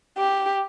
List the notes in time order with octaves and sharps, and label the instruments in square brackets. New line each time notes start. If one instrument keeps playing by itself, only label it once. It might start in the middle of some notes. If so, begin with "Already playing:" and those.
[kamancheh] G4